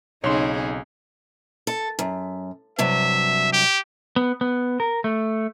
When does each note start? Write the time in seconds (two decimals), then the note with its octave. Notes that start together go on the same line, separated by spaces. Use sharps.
0.24 B1 C#3 C4 D#4 G#4 C#5 C6
1.67 A4
1.99 F#2
2.79 G2 C3 F#3 E5
3.53 G4
4.16 B3
4.41 B3
4.80 A#4
5.04 A3